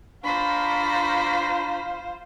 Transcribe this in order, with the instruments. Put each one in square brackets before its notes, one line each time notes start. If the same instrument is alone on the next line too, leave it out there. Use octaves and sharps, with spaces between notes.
[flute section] D4 A#5 C#6 [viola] F4 C5 [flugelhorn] F5 [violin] B5